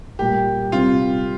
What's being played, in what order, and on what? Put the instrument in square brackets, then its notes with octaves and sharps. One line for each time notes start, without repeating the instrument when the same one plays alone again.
[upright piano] A#2 G3 A#3 [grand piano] G4
[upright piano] C3 G3 C4 [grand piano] F4